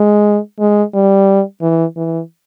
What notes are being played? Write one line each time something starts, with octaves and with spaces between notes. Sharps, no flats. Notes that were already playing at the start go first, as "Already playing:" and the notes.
Already playing: G#3
G#3
G3
E3
E3